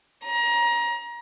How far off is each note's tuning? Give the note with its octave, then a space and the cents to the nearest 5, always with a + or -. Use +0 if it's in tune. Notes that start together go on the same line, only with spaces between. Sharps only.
A#5 +25